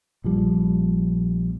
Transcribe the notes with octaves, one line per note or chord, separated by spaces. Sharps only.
A#1 F3 G3